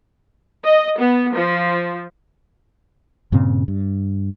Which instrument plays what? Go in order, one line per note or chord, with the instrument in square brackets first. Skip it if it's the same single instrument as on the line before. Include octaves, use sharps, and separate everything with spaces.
[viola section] D#5
B3
F3
[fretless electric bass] G2 A#2 C#3 C4
G2